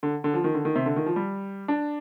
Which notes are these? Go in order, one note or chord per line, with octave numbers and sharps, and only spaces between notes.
D3
D3
F3
D#3
D3
D#3
C3
D3
D#3
F3
G3
D4